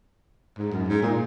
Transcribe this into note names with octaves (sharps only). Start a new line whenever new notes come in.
G#2
F#2
G#2
A#2